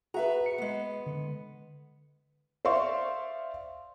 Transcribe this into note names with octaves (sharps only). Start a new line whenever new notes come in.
F#4 G#4 B4 E5 F#5 A#5
C#7
G#3 B3
D3
C5 D5 E5 F5 C6 C#6